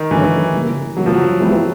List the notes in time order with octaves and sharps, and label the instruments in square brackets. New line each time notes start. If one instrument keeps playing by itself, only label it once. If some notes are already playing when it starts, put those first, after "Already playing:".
Already playing: [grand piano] D#3
[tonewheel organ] G2 D3 F#3 A3 C#4 [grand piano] E3
[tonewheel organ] C#3 E3 G3 A#3
[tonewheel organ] C#3 E3 G3 A#3 [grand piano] F#3
[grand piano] F3
F#3
[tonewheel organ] E3 G#3 B3 E4 G4